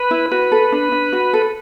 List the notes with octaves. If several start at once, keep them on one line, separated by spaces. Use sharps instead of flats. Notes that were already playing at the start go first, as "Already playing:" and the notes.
Already playing: B4
E4
F#4 B4
A4
D4
D4
F#4
A4